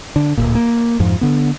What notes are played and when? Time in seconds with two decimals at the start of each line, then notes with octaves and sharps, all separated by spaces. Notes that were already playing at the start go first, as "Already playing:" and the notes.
0.16 D3
0.37 D1 G1 A#2
0.55 A#3
0.99 F2 G#2 F3
1.21 D3 B3